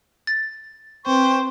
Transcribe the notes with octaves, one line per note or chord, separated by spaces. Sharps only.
A6
C4 B4 C5 G5 C#6